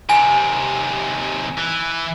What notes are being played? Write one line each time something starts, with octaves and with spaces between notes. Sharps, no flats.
D#2 C3 G#5
E3